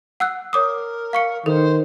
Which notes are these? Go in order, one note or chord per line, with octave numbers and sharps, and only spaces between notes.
F#5 E6 F#6
A#4 C#5 D6 D#6
F5 C#6 C#7
D#3 A4 C5